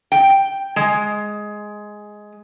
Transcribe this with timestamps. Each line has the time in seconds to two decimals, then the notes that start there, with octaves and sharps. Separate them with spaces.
0.12 G5
0.76 G#3